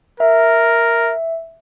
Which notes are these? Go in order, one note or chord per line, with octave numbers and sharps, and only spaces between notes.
A#4 E5